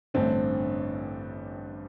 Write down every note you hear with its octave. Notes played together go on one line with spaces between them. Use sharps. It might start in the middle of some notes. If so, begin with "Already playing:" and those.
A1 G2 D3 A3 C4